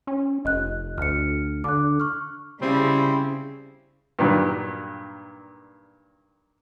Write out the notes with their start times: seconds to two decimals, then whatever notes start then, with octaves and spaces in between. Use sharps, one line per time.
0.07 C#4
0.45 F1 D#5 F#6
0.98 D2 F6 C#7
1.64 D3 D6 F#6
2.00 C#6 F6
2.62 C#3 G3 C4 E4
4.19 G2 A#2 D#3 F#3